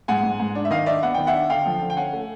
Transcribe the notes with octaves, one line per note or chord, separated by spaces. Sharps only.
G#2 F#5 G#5
G#2
G#2
D4
E5
D#3 D#5 F5
D4 D5 E5
B3 F#5
D#3 G5
E5 F#5
D4
D3 F5 G5
F3
D3
G5
C#4 F#5 G#5
A3